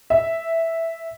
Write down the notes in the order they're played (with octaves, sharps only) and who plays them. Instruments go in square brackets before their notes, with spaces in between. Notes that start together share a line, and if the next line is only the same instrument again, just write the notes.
[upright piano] E5